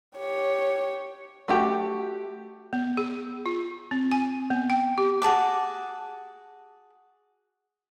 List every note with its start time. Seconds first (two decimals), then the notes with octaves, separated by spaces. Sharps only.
0.18 G4 C#5
1.48 A3 F#4 G4
2.73 B3
2.97 G#4
3.46 F4
3.91 C4
4.12 G#5
4.50 B3
4.70 G5
4.98 G4
5.22 F#4 G#4 A5 D6